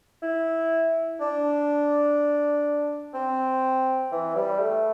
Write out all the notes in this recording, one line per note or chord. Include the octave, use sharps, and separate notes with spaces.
E4
D4
C4
E3
G3
A3